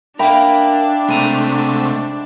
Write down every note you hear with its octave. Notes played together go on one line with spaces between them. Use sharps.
D4 A#4 E5 F5 G5 B5
C3 G#3 A3 G#5 A#5
G#2